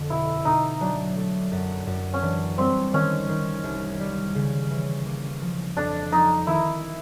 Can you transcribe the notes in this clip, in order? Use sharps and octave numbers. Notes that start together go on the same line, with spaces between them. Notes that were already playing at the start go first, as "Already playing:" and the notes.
Already playing: F2 D3
B2 E4
B2 D#4
F#3 D4
A3
F#2
F#2
C#4
E3 D4
G3 C4
D#3 C#4
D#3
C2
G3
C#3
E3
A#3
F3
F2 D4
F3 D#4
D#3 E4